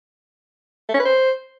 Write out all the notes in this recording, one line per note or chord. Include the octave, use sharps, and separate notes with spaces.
A3
C#4
B4
C5